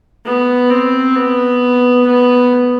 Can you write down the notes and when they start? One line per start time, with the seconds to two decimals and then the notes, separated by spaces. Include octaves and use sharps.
0.25 B3
0.70 C4
1.16 B3
2.07 B3